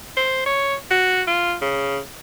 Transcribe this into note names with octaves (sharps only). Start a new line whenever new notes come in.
C5
C#5
F#4
F4
C#3